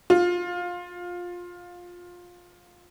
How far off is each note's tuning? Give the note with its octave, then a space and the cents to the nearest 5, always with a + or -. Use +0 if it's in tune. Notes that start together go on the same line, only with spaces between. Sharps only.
F4 +15